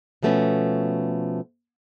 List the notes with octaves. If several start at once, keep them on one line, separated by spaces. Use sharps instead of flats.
B2 F3 A3 B3 C#4